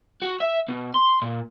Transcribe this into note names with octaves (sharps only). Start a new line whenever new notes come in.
F#4
E5
B2
C6
A#2